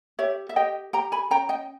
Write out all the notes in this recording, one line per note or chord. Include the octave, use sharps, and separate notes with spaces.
G4 C#5 E5
E5
G4 D#5 G5
G4 G5 A#5
G#5 B5
C#4 G5 A#5
D#5 G5